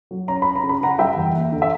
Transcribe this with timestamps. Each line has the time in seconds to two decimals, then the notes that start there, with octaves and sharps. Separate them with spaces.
0.11 F#3
0.28 C#4 A#5
0.42 C#4 B5
0.56 A#5
0.63 C#3
0.69 B5
0.81 C#3 F#5 A#5
0.99 G3 E5 G5
1.16 E2
1.34 A#3
1.52 D3
1.62 E5